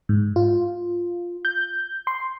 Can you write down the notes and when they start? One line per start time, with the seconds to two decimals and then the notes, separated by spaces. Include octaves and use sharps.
0.09 G#2
0.36 F4
1.45 G6
2.07 C6